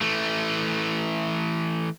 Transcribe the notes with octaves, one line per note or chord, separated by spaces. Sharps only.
E3 A3